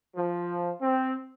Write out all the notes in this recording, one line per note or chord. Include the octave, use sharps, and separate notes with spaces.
F3
C4